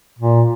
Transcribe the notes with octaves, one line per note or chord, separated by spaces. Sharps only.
A#2